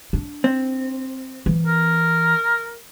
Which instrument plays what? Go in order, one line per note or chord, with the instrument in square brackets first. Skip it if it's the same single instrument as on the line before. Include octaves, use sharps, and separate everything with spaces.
[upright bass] D4
[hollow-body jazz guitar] C4
[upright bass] E3
[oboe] A#4